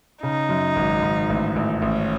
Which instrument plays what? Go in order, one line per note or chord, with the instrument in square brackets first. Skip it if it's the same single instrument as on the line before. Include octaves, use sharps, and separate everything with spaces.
[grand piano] C#3 [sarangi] D#4
[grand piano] F#2
G#1
G#1
A1
A1
[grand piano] A1 [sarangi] C#4